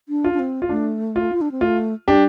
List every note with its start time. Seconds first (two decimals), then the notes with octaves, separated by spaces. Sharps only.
0.09 D4
0.24 F4
0.34 D4
0.39 C4
0.62 F4
0.69 A3 D4
1.16 F4
1.32 F4
1.41 D4
1.52 C4
1.61 A3 F4
2.08 G3 D4 G4